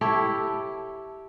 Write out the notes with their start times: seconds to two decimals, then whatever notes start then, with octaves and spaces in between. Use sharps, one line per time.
0.01 E4 G4 A4 C#5